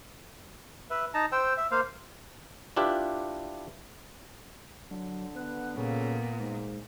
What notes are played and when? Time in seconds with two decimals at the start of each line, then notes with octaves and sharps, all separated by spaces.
0.90 B4 E5
1.14 D#4 A5 A#5
1.32 C5 G5 E6
1.57 E5
1.71 A#3 C5 F5
2.76 D4 E4 F4 G4 B4
4.91 D3 F#3
5.36 B3 F#6
5.77 A#2 C#3 A4
6.40 G#2 G#3